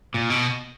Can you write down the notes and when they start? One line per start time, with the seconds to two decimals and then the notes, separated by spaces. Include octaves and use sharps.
0.14 A#2
0.30 B2